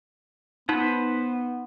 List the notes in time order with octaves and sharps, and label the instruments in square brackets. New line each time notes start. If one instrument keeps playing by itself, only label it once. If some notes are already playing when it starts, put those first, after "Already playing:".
[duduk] B3 [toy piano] D#4 [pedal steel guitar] B4 C5 F#5